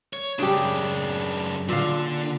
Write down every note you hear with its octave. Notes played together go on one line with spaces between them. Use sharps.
C#5
F#2 C#3 D4 G4
A#2 D3 F5